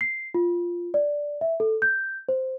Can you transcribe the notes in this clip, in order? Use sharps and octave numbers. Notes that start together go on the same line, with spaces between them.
C7
F4
D5
E5
A4
G6
C5